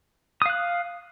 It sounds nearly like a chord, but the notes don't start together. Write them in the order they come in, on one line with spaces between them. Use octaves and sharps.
D#6 F5 F#6